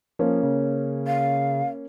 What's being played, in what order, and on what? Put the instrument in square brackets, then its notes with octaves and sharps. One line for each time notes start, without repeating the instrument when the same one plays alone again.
[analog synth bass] F3 [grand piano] A#3 C#4
[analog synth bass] C#3
[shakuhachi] F5